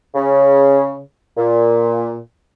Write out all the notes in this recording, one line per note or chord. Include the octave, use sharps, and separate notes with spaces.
C#3
A#2